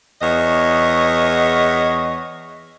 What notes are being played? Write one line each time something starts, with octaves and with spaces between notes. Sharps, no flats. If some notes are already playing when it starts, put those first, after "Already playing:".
E2 C#5 D#5